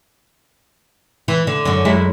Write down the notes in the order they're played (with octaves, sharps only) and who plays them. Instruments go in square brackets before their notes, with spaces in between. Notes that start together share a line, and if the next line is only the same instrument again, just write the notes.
[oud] E3
D3
F#2 D3
F#2 G#3 E4